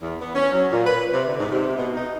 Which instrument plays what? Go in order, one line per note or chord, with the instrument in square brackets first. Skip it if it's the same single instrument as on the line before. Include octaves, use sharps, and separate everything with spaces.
[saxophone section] E2
B3
C#4
F#3
A#2
B4
C3
D3
G#2
C3
B2
D#4